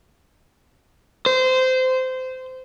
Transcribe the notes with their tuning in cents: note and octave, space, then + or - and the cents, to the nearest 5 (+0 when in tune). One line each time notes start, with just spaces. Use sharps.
C5 -20